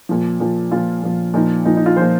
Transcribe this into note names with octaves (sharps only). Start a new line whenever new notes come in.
A#2 F3
A#2 F3
A#2 F3 F4
A#2 F3
A#2 F3 D#4
A#2 F3 D#4
D#4
F4
A#2 F3 C5